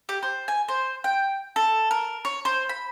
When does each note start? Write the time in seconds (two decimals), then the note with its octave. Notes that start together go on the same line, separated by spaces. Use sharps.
0.09 G4
0.23 C5
0.48 G#5
0.68 C5
1.04 G5
1.56 A4
1.91 A#4
2.25 C#5
2.45 C5
2.69 B5